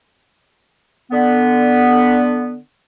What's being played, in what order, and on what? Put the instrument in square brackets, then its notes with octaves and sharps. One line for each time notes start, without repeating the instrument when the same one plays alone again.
[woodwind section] D3 B3